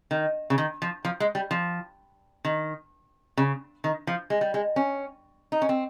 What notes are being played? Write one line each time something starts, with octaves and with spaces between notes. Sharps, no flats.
D#3
C#3
D#3
F3
F3
G#3
G3
F3
D#3
C#3
D#3
F3
G#3
G3
G#3
C#4
D#4
C#4
C4